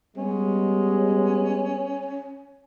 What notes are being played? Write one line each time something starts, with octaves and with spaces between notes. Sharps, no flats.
G3 G#3 B3 C#4